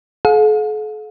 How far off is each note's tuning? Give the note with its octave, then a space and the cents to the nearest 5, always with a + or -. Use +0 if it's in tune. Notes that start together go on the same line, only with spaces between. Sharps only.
A4 -45 F5 +45